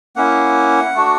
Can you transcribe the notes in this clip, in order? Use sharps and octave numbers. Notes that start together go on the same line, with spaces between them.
A#3 C#4 E4 F#5
A3 D4 F#4